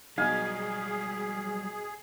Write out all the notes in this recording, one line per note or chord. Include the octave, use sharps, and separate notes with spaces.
B2 F#3 G3 D#4 G#4 F5 G#5